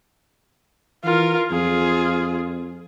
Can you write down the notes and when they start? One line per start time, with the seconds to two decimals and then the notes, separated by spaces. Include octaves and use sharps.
1.04 E3 F4 A#4
1.51 F2 F4 G#4